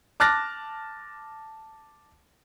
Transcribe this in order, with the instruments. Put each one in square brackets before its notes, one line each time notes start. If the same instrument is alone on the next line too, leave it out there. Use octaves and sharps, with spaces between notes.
[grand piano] A5 D6 F6 F#6 A6 A#6